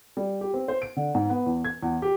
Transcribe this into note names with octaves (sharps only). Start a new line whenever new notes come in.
G3
G4
C4
C5
D7
D3
G#2
B3
E2
G#6
E2
G4